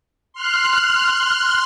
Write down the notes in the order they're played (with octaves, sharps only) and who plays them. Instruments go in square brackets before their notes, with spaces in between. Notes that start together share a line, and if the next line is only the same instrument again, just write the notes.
[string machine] C6 F6 F#6